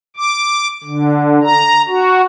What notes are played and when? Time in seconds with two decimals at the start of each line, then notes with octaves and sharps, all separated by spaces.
0.16 D6
0.84 D3
1.43 A#5
1.88 F#4